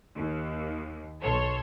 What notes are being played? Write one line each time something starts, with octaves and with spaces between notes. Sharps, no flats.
D#2
B1 A4 C#5 C6